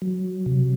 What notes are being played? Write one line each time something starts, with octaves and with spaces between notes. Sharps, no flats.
F#3
C3